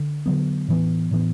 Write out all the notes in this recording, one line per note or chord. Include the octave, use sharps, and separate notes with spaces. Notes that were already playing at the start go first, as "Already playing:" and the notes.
Already playing: D3
D3 F#3 B3
A2 E3 B3
A2 E3 B3